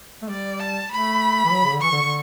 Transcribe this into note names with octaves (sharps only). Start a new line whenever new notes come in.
A3
G3 D5
A5
A3 B5
E3
F#3
C#3
D3
E3 C#6
D3
D3